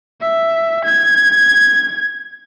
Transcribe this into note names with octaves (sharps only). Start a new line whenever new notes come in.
E5
G#6